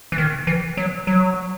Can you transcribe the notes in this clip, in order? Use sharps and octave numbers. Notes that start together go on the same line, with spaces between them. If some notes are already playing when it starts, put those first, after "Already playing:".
E3
D#3
E3
F#3
F#3